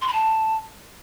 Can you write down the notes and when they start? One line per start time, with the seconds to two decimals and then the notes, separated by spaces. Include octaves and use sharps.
0.01 C6
0.07 B5
0.13 A5